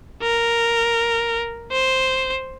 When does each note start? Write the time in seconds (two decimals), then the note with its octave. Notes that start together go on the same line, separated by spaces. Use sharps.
0.22 A#4
1.71 C5